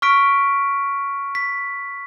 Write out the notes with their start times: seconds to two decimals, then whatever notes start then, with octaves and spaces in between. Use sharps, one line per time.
0.02 C#6 F6 B6 D7
1.35 B6